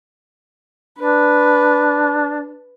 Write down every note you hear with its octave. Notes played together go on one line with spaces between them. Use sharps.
D4 B4